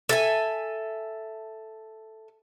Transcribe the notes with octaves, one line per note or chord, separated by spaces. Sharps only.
A4 E5 G#5